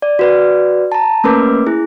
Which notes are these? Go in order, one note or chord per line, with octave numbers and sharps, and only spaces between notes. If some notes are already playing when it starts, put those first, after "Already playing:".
D5
F#4 B4 D5
A5 A#5
A3 A#3 C#4 A#4 B4 D6
E4 G#4